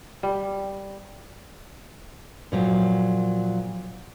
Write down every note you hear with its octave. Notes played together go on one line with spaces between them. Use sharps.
G3
A#2 F3 F#3